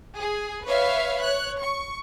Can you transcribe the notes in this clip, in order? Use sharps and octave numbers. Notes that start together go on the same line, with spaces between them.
G#4
B4 C#5 E5 F5
C#5 F#6
C#6